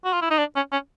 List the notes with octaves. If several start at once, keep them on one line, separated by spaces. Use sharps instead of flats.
F#4
F4
E4
D#4
D4
C#4
C#4